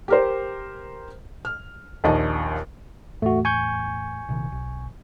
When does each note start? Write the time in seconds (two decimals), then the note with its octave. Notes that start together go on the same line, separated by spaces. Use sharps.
0.08 G4 A#4 C5
1.45 F6
2.04 A#1 D#2 D#5 A5
3.22 E2 A2 A3 F#4
3.45 G#5 C#6 G6
4.29 A#1 C3 D#3
4.52 B1